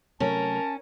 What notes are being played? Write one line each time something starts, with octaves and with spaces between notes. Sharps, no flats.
C3 F#3 A3 C#4 A#4 A5